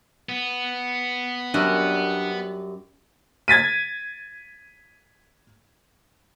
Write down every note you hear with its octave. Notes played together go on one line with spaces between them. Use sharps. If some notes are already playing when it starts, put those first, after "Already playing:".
B3
F#2 G3 D4 F#6
G#6 A6 B6 D#7